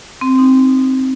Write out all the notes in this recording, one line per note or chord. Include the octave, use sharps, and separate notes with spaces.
C4
D#4